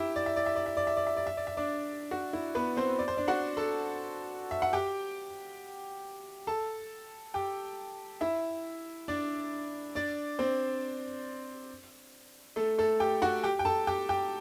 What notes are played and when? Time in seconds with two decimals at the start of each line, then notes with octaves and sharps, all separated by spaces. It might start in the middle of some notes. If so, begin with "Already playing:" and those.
Already playing: E4 G4 E5
0.16 D5
0.26 E5
0.36 D5
0.46 E5
0.56 D5
0.66 E5
0.77 D5
0.87 E5
0.97 D5
1.07 E5
1.17 D5
1.27 E5
1.37 D5
1.47 E5
1.57 D4 D5
2.11 F#4
2.33 E4
2.55 B3 B4
2.77 C4 C5
2.99 D5
3.08 C5
3.17 D4 D5
3.28 F#4 F#5
3.57 A4 A5
4.51 E5
4.62 F#5
4.73 G4 G5
6.47 A4 A5
7.34 G4 G5
8.21 E4 E5
9.08 D4 D5
9.95 D4 D5
10.39 C4 C5
12.56 A3 A4
12.78 A3 A4
13.00 G4 G5
13.22 F#4 F#5
13.43 G4 G5
13.59 G5
13.65 A4 A5
13.87 G4 G5
14.09 G4 G5